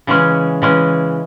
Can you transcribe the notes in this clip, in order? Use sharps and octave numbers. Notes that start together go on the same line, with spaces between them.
C#3 E3 G#3 C#4
C#3 E3 G#3 C#4